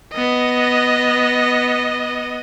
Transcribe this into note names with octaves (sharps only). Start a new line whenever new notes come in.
B3 D#5